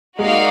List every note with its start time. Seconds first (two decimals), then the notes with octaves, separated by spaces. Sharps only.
0.19 G#3 A#3 D#4 F#4 D5 F5